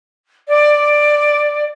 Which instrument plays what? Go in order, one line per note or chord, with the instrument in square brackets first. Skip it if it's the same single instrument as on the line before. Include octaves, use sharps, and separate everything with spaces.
[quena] D5